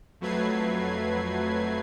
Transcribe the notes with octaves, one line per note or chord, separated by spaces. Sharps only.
F2 F#3 A3 B4 G#6 C7